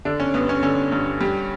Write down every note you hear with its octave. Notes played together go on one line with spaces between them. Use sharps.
D3 D4
C#4
G2 B3
C#4
D3 C#4
G2
G3